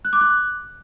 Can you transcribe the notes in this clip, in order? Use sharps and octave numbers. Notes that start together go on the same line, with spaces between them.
F#6
D6
F#6